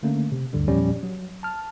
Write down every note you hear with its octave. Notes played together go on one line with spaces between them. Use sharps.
D3 A3 A#3 C#4
C3
D2 G2 D3 G3
E2 A#2 F3 G3 C#4
F#3
A5 F6